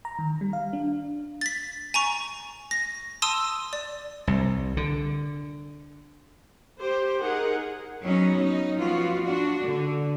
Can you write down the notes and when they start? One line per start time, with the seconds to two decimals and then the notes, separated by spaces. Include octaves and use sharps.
0.05 A#5
0.19 D#3
0.41 G3
0.53 F5
0.73 D4
1.41 A6 B6
1.94 G#5 A#5 C#6
2.71 A#6
3.22 A5 C6 D#6 E6 D#7
3.73 D5
4.27 C2
4.77 D3
6.80 G4 C5
7.21 D#4 G#4 A#4 F#5
8.01 F#3 B3 C#4 D#4
8.42 D#4
8.77 F3 B3 F4 F#4
9.25 D4 F#4
9.61 D3